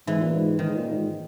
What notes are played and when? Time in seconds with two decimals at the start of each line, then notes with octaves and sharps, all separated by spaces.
0.07 G#2 E3
0.21 A#2
0.34 G#2
0.59 G#2 D#3
0.69 G#2
0.76 A#2
0.93 G#2